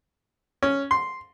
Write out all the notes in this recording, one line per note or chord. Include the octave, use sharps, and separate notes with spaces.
C#4
C6